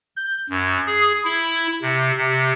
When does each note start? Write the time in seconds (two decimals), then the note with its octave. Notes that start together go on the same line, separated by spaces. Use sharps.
0.16 G6
0.50 F#2
0.86 G#4
1.24 E4
1.82 C3
2.17 C3